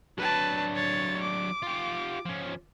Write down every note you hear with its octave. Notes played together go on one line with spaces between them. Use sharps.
F#3 D4 B4 A5
C#5 A6
D6
F4 G4
F3 C#4